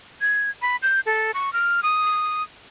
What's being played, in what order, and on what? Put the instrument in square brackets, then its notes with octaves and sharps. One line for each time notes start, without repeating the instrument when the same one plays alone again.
[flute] G#6
B5
G6
A4
C#6
F6
D#6